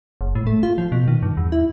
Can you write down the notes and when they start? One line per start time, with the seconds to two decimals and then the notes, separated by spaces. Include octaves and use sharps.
0.21 F#1
0.35 A2
0.47 A3
0.63 F4
0.78 F3
0.92 B2
1.08 D#3
1.23 G2
1.37 E2
1.52 E4